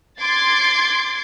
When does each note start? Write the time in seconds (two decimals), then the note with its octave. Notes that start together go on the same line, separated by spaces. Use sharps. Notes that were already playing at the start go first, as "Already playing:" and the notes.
0.21 C6 D6 G#6 A6 C7